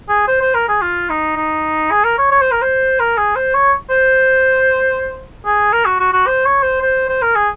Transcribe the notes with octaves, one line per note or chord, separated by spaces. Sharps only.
G#4
C5
C5
A#4
G#4
F4
D#4
D#4
G#4
A#4
C#5
C#5
C5
A#4
C5
A#4
G#4
C5
C#5
C5
G#4
A#4
F#4
F#4
F#4
C5
C#5
C5
C5
C5
A#4
G#4